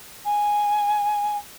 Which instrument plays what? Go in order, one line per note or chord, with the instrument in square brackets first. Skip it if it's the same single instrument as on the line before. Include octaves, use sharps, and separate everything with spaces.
[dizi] G#5